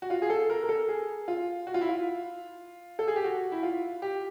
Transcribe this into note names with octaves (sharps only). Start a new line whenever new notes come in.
F#4
F4
G#4
A4
A#4
A#4
A4
G#4
F4
F#4
F4
E4
F4
A4
G#4
G4
F#4
E4
F4
G4